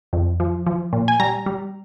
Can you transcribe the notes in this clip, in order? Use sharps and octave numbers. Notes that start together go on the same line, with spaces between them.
F2
F3
F3
A#2
G#5
G3 A#5
G3